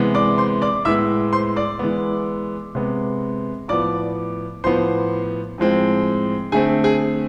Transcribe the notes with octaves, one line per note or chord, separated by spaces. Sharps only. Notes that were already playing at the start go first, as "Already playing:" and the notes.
Already playing: C3 E3 G#3 B3
D5 D6
C5 C6
D5 D6
A2 G#3 B3 E5 E6
C5 C6
D5 D6
E3 G#3 B3
C3 G#3 B3
A2 F3 B3 D5 D6
A2 F3 B3 C5 C6
A2 F3 G#3 C4
D3 A3 C4 G#4 G#5
G#4 G#5